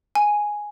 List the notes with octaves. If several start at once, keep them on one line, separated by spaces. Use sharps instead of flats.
G#5